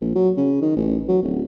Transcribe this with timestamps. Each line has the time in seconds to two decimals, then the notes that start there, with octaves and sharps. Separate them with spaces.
0.01 A#1
0.15 F#3
0.37 C#3
0.62 D#3
0.77 A1
1.08 F#3
1.23 D1